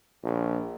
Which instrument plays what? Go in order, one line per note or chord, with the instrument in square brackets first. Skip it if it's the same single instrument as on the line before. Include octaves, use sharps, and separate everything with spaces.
[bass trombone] A#1